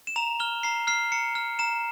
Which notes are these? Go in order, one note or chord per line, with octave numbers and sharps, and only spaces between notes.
E7
A#5 F7
F6 G7
A#5 C7
F6 C7
A#5 C#7
F6
A#5 E7